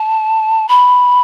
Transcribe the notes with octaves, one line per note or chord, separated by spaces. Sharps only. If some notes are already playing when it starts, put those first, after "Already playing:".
Already playing: A5
B5